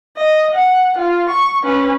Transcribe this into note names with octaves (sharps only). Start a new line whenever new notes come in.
D#5
F#5
F4
C#6
C#4 B4